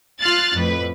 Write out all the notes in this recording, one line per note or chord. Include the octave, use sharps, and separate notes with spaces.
F4 C6 F6 F#6 A6
F2 A2 B4